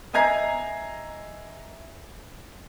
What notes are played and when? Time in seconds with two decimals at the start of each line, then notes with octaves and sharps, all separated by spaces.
0.13 D#5 E5 G#5 A#5 G#6 C7